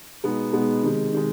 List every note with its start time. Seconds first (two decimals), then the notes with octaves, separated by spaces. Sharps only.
0.24 B2 G#3 B3 D#4
0.53 B2 G#3 B3 D#4
0.83 C3 D#3 G#3
1.13 C3 D#3 G#3